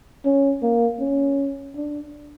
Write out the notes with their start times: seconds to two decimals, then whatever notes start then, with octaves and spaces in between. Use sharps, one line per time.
0.25 C#4
0.62 A#3
0.99 C#4
1.76 D4